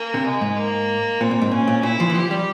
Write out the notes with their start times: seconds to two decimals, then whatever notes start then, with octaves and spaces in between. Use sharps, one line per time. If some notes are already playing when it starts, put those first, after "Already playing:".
Already playing: A#3
0.14 C3
0.25 G#3
0.41 G#2
0.56 A#3
1.20 A#2 C4
1.31 A#2
1.41 G#2
1.51 A#2 C#4
1.68 A#2
1.83 A#2 E4
2.00 F3
2.10 E3
2.15 F3 G4
2.31 G3